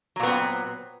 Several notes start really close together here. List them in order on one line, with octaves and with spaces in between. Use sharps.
F#3 A#2 B3 C4